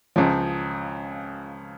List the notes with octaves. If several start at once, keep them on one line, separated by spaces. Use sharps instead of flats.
C#2 C#3 F3